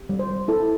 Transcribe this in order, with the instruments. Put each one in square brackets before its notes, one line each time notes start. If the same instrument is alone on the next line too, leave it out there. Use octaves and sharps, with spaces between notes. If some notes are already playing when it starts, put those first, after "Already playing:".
Already playing: [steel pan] G4
G3
C5
G3
E4 A4